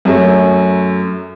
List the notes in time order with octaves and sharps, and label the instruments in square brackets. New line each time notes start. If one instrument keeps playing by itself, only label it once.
[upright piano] F#2 F#3 A3